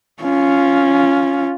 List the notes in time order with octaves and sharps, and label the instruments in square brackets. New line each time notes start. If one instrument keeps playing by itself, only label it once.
[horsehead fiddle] C#4 F4